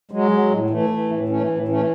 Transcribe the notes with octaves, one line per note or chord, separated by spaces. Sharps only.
F#3 G#3
F#3
A2
E3 A3
E3
A2
E3 A3 C#4
A2
E3 A3 C#4